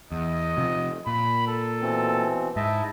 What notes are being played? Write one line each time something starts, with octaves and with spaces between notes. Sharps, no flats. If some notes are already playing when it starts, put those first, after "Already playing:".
E2 D#5
C3 F3
A#2 B5
A4
B2 E3 C4
G#2 E4 D#5 E5 A5